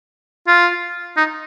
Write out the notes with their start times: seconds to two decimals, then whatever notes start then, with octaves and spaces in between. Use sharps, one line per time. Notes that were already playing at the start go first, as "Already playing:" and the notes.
0.47 F4
1.17 D#4